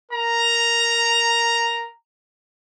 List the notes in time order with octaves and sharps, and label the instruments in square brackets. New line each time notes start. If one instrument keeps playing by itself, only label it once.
[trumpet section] A#4 A#5